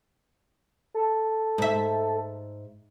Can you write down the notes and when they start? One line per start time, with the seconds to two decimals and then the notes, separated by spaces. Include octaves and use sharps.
0.94 A4
1.58 G#2 E5